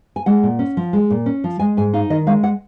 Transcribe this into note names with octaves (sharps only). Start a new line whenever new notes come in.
G#5
G#3 F#5
A#2
C#4
F3
G#3
A#2
C#4
F3
G#3 G#5
G#2 G#5
D#4 F5
D#3 D#5
G#3 F5
F#5